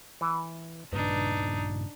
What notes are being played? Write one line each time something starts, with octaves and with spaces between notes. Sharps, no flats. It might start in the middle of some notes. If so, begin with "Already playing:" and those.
E3
G2 A#2 C#3 D4 D#4 B4